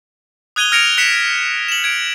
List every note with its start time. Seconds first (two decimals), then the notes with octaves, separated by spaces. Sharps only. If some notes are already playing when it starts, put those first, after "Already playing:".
0.56 D#6 F#6 G#6 D#7 F7 G7
0.72 F6 G#6 A#6 C#7 D7 F7
0.98 F#6 B6 C#7 E7
1.68 E7 F#7
1.84 G#6 D7